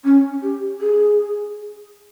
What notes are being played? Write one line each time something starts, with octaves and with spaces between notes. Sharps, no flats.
C#4
G4
G#4